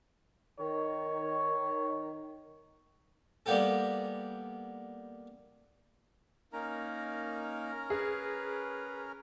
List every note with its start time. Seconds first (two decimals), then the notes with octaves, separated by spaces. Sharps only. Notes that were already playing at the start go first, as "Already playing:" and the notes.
0.59 D#3 C#5
3.46 G3 A#3 B3 G4 A4
6.53 A#3 C#4 D#4 A#4 A#5
7.90 G#4 B4